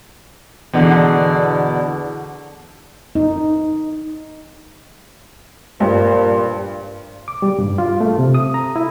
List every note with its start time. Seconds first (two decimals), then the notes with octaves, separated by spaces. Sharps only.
0.73 E2 B2 D3
3.15 D#4
5.80 G2 A#2 C5
7.28 D6
7.42 G3
7.59 G2
7.78 F4
8.01 A3
8.18 C3
8.34 D#6
8.54 A#5
8.76 E4